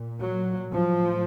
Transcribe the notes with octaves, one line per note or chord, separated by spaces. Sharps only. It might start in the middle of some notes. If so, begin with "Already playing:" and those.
Already playing: A#2
F#3
A2 F3